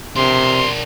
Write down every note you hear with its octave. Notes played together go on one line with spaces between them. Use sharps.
C3 D4 A#4 C6